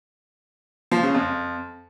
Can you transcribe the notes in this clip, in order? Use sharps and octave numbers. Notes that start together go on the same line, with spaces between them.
F3
C#3
F2